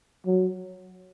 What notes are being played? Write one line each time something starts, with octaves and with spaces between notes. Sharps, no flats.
F#3